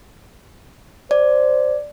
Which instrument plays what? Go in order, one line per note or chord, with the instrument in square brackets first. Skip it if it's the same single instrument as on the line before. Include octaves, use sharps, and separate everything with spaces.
[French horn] C5 [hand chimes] D5